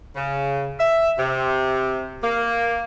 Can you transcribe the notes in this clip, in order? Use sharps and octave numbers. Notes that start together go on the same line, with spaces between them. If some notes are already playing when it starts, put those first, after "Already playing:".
C#3
E5
C3
A#3